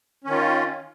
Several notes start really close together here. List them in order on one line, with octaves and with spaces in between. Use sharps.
C#4 D#3 F4